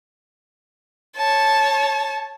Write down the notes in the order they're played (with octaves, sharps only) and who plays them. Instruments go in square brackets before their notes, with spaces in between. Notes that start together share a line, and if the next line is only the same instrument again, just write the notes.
[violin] C#5 A5